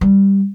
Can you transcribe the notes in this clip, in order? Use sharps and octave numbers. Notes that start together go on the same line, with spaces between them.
G3